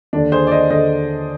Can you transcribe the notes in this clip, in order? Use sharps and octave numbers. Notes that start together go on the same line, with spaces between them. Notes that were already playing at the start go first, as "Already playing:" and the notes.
D#2 D3 D4
G#4 C5
D5
C5 D#5
D3 C5 D#5